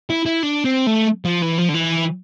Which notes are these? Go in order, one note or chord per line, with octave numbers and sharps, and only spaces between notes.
E4
E4
D4
C4
A3
F3
E3
F3
D3
E3